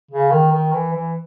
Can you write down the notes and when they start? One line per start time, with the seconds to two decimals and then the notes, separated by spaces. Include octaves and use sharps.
0.11 C#3
0.32 D#3
0.52 D#3
0.73 E3
0.93 E3